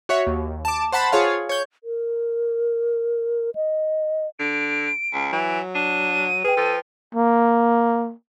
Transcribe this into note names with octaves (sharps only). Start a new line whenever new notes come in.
F#4 C#5 E5
D#2
A5 D6
C5 F#5 A5 B5
F4 G#4 C#5 F5
C#5 G6
A#4
D#5
D3 D7
C#2
E3 F#3
D4 D#7
G#4 B4 G5
F3 A4
A#3